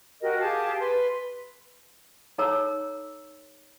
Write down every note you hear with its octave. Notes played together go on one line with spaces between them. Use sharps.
F#4 G4 A#4 D#5
G4 G#4 F5 A5
B4 C6
D#4 A4 C#5 A#5 E6